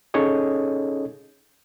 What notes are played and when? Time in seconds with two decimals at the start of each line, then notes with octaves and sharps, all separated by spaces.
0.14 C#4 D#4 G#4 A4 C#5 D#5